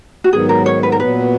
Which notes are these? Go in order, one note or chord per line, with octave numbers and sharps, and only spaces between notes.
F#4
G#2 D#3 F#3 B3 G#4
A#4
C#5
B4
A#4
A#2 F#3 B3 B4